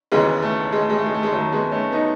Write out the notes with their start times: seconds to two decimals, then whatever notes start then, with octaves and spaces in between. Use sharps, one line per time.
0.12 E1 D#2 C#3 E3 G#3 B3
0.42 A3
0.72 G#3
0.81 A3
0.90 G#3
0.97 A3
1.06 G#3
1.14 A3
1.23 G#3
1.32 D#2 D#3 F#3 A3
1.52 G#3 B3
1.72 A3 C#4
1.92 B3 D#4